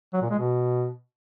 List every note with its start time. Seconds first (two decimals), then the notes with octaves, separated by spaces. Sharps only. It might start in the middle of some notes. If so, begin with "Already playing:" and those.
0.13 F#3
0.22 A#2
0.30 G#3
0.39 B2